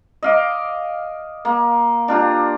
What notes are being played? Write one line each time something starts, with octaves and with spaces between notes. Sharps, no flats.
D#5 F5 D6
A#3
D4 F4 G4 A#5